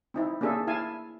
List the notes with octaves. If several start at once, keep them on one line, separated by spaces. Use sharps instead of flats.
C4 D#4 E4
A#3 C#4 D4 G#4 A4 E5
E4 F5 G#5 A5